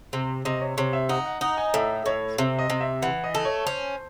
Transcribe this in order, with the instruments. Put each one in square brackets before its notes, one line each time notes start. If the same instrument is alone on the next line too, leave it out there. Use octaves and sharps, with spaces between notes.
[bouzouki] C3
[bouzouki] C3 [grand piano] D#5
[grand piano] C#5
[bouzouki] C3 [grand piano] C#5
[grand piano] E5
[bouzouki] D#4 [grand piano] F#5
[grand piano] F#5
[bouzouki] D#4 [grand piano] F#5
[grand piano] G#5
[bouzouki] A2 [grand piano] E5
[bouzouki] A2 [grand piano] C#5
[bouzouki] C3 [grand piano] E5
[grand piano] D#5
[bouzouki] C3
[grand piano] E5
[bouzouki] E3 [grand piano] F#5
[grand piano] D#5
[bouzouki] A3
[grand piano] C#5
[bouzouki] C#4 [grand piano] C5